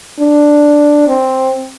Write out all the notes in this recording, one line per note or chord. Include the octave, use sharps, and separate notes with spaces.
D4
C4